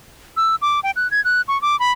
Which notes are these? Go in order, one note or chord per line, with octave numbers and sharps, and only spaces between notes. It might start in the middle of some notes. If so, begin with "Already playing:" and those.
E6
D6
G5
F#6
G#6
F#6
C#6
D6
B5